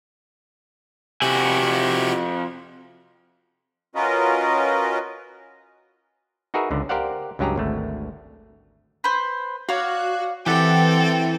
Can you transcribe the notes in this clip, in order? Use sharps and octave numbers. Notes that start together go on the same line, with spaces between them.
F2 C3 E4 F#4 G4 G#5
C#4 F4 F#4 A#4 B4 D#5
D#4 F#4 G#4 A#4 B4 E5
C#2 D3
G4 A#4 C5 D5 F5 F#5
C#2 G2 F#3 G4 G#4 A#5
G#1 D2 A3
B4 C5
F#4 C#5 D5 F5
E3 C4 G4 A4 F#5 G5